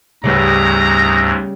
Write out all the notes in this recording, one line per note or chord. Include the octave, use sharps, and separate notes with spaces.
D2 G#2 C#3 G3 B3 A#5